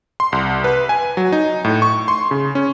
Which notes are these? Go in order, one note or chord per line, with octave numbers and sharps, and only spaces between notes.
C6
C2
B4
G#5
F#3
D#4
A2
C#6
C6
C#3
C#4